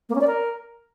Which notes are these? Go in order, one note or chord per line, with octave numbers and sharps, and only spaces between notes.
A#3
C#4
D5
A#4